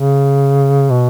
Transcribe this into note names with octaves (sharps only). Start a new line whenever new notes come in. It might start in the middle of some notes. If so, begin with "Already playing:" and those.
Already playing: C#3
B2